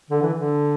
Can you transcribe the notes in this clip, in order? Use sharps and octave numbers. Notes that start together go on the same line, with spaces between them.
D3
E3
D3